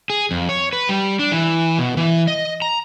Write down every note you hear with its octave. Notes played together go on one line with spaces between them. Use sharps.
G#4
F2
C#5
B4
G3
D4
E3
B2
E3
D#5
A#5